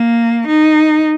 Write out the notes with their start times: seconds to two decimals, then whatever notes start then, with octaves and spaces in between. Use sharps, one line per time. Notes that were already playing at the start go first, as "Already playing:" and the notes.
Already playing: A#3
0.47 D#4